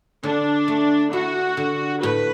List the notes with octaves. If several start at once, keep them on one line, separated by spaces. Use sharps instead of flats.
D3 D4
A3
E4 F#4
D3
A2 B4